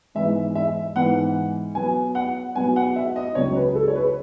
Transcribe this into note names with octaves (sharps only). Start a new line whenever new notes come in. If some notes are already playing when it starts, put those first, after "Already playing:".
G#2 E3 G#3 B3 E5
E5
G#2 E3 G#3 B3 F#5
B2 F#3 B3 G#5
F#5
B2 F#3 B3 G#5
F#5
E5
D#5
C#2 C#3 F#3 C#5
B4
A4
C#5
B4